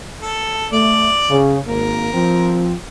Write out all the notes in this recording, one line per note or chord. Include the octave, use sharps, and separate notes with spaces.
A4
A3 D5
C#3
G#1 A#3 A#4
F3 C4